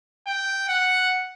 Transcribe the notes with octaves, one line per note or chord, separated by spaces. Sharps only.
G5
F#5